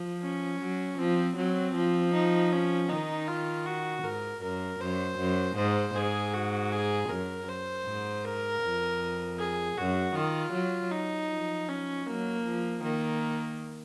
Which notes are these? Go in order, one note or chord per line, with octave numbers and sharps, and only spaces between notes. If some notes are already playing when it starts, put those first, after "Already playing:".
Already playing: F3
C#4
F#3
F3 C4
F#3 C4
F3
D#4
C#4
D#3 D#4
F4
F#4
G#2 A#4
F#2 A#4
F#2 C5
F#2
G#2 C5
G#2 G#4
F#4
G#4
F#2 A#4
C5
G#2
A#4
F2
G#4
F#2 F#4
D#3 F4
F#3
D#4
F3
C#4
F#3 A#3
F3
D#3 A#3